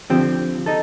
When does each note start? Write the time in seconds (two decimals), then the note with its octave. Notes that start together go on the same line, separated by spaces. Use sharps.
0.10 D3 F3 C4 G4
0.66 D#4 A4